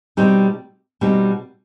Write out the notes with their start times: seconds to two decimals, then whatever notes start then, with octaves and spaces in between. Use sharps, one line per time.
0.17 B2 G3 C4 D#4
1.01 B2 G3 C4 D#4